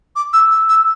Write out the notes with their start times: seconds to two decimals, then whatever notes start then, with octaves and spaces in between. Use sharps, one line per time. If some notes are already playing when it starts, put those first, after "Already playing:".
0.16 D6
0.33 E6
0.51 E6
0.69 E6